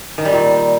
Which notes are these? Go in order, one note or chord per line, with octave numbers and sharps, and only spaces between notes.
D#3
G3
A#2